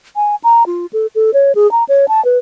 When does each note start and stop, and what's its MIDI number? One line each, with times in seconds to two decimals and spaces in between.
0.16 0.35 80
0.44 0.63 82
0.66 0.86 65
0.93 1.07 69
1.15 1.31 69
1.34 1.52 73
1.55 1.70 68
1.72 1.84 82
1.89 2.06 73
2.08 2.23 81
2.25 2.38 71